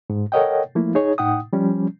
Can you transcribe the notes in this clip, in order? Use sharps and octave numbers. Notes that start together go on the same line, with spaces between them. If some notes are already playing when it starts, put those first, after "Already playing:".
G#2
A4 A#4 C#5 D#5 F#5 G5
F3 A3 A#3 E4
D#4 G#4 C#5
A2 D#4 F#5 G5 D#6
F3 G3 C#4